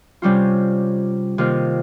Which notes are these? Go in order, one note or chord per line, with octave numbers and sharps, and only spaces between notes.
C3 G3 C#4 F4
C3 D#3 A#3 F4